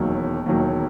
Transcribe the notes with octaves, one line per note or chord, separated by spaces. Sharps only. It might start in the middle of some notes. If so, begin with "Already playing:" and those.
Already playing: E1 D#2 D#3 F#3
E1 D#2 D#3 F#3